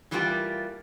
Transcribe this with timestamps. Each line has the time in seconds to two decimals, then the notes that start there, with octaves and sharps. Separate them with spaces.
0.11 E3 G3 A3 A#3 F4 G4